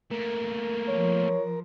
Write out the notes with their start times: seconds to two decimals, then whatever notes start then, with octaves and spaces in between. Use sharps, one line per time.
0.11 A3 A#3 A#4
0.88 F3 C#5